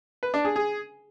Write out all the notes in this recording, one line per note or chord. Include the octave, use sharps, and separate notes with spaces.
B4
D4
G#4
G#4